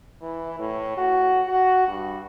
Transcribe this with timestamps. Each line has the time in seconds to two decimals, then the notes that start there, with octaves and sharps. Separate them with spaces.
0.22 E3
0.59 A2
0.97 F#4
1.48 F#4
1.87 G2